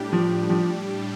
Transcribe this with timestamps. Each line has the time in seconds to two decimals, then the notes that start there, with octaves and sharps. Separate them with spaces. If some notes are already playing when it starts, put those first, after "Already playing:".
Already playing: A2 G3 D4 G4
0.13 F3
0.50 F3